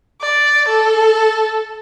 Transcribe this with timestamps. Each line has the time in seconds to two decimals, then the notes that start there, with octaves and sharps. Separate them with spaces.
0.22 D5
0.68 A4